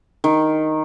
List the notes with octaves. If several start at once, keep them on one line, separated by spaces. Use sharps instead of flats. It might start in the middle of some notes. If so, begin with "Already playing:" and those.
D#3